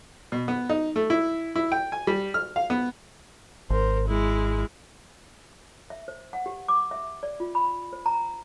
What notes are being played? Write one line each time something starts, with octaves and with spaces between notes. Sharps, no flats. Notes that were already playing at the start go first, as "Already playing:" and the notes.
B2
B3
D#4
A3
E4
E4
G5
G#5
G3
F6
F5
B3
G#1 A#4 C5
G#3 E4
E5
C5
F#5
G4
D6
E5
D5
F4
B5
C5
A#5